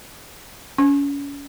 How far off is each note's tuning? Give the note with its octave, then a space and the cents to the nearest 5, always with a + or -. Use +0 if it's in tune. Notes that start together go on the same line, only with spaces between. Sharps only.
C#4 +30